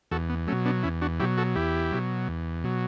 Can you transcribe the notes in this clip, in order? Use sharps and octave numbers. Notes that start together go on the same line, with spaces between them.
E2 F#4 A4
B3
B2 F#3 A3 C#4
B3 D4
E2 C#4 E4
D4 F#4
B2 F#3 E4 G4
F#4 A4
E2 E4 G4
B2 F#3
E2
B2 F#3